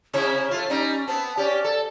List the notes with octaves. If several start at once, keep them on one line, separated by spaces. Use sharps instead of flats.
C3 C#4 E4 C#5
A3 F4
G3 C#4 D#4
B3 C4 A5
C#4 G4 D5
A4